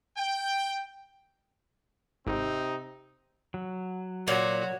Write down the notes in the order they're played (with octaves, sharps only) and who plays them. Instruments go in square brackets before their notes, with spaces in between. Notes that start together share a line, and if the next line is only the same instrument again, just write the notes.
[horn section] G5
[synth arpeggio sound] G#1 [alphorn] C3 [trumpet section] C4 D#4
[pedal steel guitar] F#3
[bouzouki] A#2 [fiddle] F#4 [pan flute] C#5